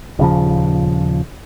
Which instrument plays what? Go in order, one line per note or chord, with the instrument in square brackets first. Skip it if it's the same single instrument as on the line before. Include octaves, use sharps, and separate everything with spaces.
[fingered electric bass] D#1 C#3 F3